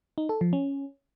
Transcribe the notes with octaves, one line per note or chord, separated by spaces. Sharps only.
D#4
A4
F3
C#4